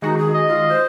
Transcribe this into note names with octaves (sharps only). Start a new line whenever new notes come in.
D#3 G#3 D#4 F#4
G#4
D#5
F4
C5